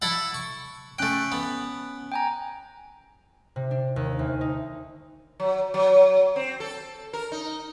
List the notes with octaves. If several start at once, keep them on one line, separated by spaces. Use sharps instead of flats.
E4 A4 F#5
C#6
A3 C#4 G5 F#6 D7
B3
G5 G#5 A#5
C3
D4
D#2
D2
D#4
F#3
F#3
C4
A4
A#4
D#4